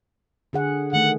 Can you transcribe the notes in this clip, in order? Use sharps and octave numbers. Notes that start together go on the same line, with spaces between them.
D3 G#4 F#5
D#3 A3 F#5